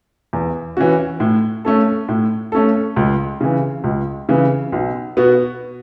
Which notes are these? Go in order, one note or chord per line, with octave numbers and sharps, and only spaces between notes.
E2
E3 C#4 F#4
A2
A3 C#4 A4
A2
A3 C#4 A4
C#2
C#3 E3
C#2
C#3 E3
B1
B2 B3 F#4